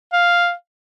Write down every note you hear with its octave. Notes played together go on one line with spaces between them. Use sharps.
F5